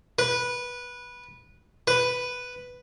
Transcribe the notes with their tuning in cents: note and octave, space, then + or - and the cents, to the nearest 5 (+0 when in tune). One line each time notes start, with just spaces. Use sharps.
B4 -15
B4 +0